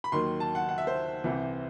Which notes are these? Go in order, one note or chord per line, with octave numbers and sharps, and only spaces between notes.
B5
D#2 D#3 F#3 C6
A5
F#5
F#5
E5
C5
C2 C3 E3